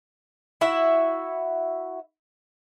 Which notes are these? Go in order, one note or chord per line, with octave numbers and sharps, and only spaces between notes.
E4 F#4 E5